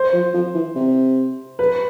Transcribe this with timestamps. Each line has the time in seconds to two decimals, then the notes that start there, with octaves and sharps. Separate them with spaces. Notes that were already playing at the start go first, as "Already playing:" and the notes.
Already playing: C5
0.13 F3
0.34 F3
0.54 E3
0.76 C3
1.59 B4